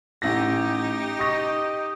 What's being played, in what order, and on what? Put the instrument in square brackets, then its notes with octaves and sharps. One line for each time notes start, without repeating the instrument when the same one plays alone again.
[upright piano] A1 A#6 [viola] D#4 G4
[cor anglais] D#5 [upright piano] C#6 A#6